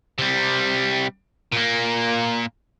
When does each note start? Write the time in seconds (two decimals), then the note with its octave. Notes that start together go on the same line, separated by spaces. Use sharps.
0.19 C3 G3
1.52 A#2 A#3